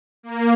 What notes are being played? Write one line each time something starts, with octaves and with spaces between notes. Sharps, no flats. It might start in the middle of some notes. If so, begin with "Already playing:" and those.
A#3